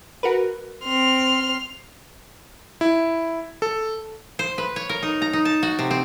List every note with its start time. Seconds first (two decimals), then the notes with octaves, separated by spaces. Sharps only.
0.23 F#4 A#4 B4
0.84 C4 C6 F6
2.81 E4
3.62 A4
4.39 C5
4.58 B4
4.76 C#5
4.89 A#4
5.03 D#4
5.22 A#5
5.33 D#4
5.45 A5
5.63 F#4
5.79 C3
5.91 C4